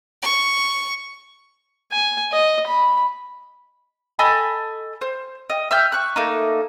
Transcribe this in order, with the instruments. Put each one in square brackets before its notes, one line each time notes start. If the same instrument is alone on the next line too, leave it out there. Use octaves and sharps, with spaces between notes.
[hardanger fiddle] C#6
[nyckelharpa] G#5
D#5
B5
[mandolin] A4 D#5 G#5 B5
C5
D#5
E5 E6 F6 G6
C#6 F#6
A3 A#3 D#4